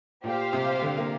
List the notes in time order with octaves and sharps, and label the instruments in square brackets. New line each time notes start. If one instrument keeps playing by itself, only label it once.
[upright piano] A#2 [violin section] G4 C5 F5
[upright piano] C3
D3
A#3